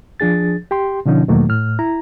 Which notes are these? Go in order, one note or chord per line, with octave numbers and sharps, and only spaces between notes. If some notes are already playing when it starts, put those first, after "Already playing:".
F3 D4 G#4 A6
G4 G5 C6
B2 D3 F3 C#4 D#4
E2 B2 D#3 F#3 A3 A#3
A2 F6
E4 A#5